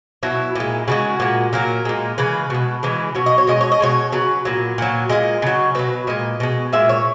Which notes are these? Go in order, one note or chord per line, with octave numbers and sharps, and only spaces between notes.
B2 F#3 E4
A#2 G#3
C#3 E3 G#3 F#4
A#2 G#3
A#2 F#3 A#4
A#2 G#3
C#3 E3 G#3 B4
B2 G#3
C#3 E3 G#3
B2 F#3 C#5
D#5
C#5
B2 G#3 D#5
C#5
D#5
B2 G#3 C#5
C#3 F#3 B4
A#2 F#3
A#2 F#3
A#2 G#3 D#5
C#3 F#3
B2 F#3 B4
A#2 G#3 D#5
B2 G#3
A#2 G#3 E5
C#5